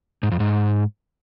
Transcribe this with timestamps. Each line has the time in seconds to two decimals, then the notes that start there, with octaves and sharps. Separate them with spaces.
0.23 G#2
0.31 F2
0.40 G#2